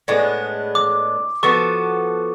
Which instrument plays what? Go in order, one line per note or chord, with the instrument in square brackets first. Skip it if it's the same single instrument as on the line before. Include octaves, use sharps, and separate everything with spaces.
[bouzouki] A2 G#3 B3 D4
[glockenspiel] D6
[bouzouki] F3 B3 F#4 A4 [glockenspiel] C#6